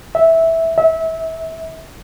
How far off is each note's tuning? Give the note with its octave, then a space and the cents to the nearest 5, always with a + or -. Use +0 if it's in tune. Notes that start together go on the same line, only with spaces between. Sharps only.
E5 -10
E5 -25